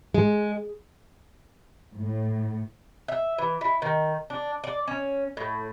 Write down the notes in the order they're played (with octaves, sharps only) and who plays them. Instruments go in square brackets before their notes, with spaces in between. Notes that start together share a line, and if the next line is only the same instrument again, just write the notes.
[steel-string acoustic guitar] G#3
[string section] A2
[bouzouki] E5
E3
E4
D#3
D4
D5
C#4
A2